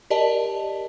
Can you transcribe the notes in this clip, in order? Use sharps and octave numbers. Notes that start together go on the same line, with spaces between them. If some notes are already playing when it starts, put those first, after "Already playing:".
G4 A#4 D5 D#5 A5